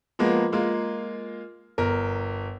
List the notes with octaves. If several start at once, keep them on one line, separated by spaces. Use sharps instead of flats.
F3 G#3 A#3 B3
G#3 A#3 F4
G1 A#4